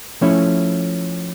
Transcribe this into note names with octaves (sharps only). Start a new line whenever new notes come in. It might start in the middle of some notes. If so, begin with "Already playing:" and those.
F3 A3 C#4 E4